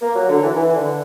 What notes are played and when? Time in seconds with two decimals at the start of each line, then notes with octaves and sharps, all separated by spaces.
0.02 A#3
0.15 F#3
0.29 D3
0.43 E3
0.56 E3
0.76 D3